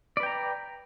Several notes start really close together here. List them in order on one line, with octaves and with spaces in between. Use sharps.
D5 B4 G5 A#5